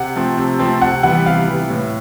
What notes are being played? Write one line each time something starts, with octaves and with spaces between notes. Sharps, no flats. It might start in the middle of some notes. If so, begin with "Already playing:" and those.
Already playing: C3 F#5
F3 A3 C4
C3
F3 A3 C4
C3 F#5
E3 G3 B3 F#5
C3 F5
E3 G3 B3
A2